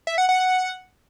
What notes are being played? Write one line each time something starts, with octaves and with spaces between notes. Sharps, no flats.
E5
F#5
F#5
F#5